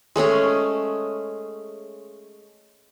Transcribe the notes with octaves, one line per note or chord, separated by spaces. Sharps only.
G#3 A3 C#4 G#4